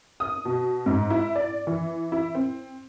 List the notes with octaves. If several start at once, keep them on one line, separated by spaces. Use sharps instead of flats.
D#6
B2
G#2
E4
D5
E3
E4
C4